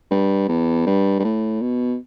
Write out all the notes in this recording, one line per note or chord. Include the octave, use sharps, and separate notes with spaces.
G2
E2
G2
G2
A2
B2